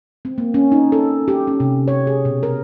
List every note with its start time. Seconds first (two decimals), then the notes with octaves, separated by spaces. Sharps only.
0.25 C4
0.38 A#3
0.54 C#4
0.72 D#4
0.92 A4
1.28 G4
1.47 C#4
1.60 C3
1.88 C#5
2.07 G#4
2.25 B2
2.43 A#4